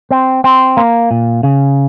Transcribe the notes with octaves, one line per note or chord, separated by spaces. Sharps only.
C4
C4
A#3
A#2
C#3